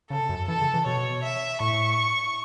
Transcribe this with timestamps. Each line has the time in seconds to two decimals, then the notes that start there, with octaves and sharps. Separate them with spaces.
0.10 C#3 A4
0.29 F#2
0.48 E3 A4
0.61 C#3
0.74 E3
0.86 B2 C#5
1.23 E5
1.60 A2 C#6